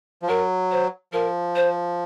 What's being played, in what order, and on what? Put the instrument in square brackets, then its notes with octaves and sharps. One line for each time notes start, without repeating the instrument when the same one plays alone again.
[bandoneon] F3
[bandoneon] F#3 [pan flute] A#4
[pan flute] C5
[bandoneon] F3 [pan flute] A#4
[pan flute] C5